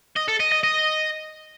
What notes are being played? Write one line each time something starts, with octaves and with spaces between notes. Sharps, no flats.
D#5
A4
D#5
D#5
D#5